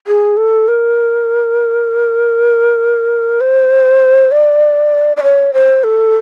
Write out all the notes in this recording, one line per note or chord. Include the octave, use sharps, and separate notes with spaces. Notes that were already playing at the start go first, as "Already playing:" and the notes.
G#4
A4
A#4
C5
D5
D5
C#5
C5
A4